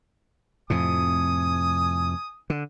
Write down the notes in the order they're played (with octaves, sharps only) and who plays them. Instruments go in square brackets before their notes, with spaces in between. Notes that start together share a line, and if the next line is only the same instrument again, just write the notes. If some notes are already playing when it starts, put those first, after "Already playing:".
[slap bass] F2 A2 C3 [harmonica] G#5 D#6
[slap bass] D3